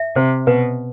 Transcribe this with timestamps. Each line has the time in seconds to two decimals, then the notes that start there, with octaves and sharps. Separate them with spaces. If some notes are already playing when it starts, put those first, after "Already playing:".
Already playing: E5
0.16 C3 C5
0.47 B2 B4